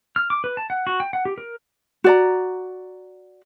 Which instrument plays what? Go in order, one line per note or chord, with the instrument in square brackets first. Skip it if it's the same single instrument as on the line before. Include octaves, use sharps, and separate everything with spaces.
[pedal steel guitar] F6
D6
B4
A5
F#5
F#4
G5
F#5
G4
A#4
[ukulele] F#4 D5 A#5